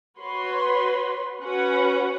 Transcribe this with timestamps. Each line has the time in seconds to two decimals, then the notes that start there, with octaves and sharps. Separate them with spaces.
0.18 F#4 B4 C#5 C6
1.41 C#4 F#4 B4 F#5